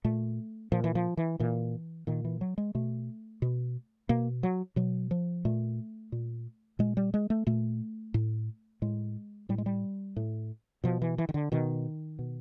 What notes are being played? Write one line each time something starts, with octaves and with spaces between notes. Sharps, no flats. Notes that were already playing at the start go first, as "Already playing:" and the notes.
A#2 A3
A#2 F3
E3
F3
E3
A#2 E3
A#2 D#3
E3
F#3
G#3
B2 A3
B2
B2 A#3
F#3
B2 F#3
F3
A#2 A3
A#2
A#2 G#3
G3
G#3
A3
A#2 A3
A2
A2 G#3
A2 G3
G#3
G3
A2
B2 F3
E3
E3
D#3
D3
B2 D#3
B2